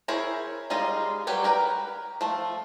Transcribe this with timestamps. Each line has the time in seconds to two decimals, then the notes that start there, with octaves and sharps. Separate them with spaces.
0.08 E4 G#4 A#4 C5 C#5
0.70 G3 G#3 D#4 F4 D#5
1.27 F#3 G3 G4 B4 C#5
1.44 A#4 B4 G5
2.21 F3 A3